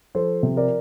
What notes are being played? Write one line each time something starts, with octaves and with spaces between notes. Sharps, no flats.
F3 A4 C5
C3
A#4 D5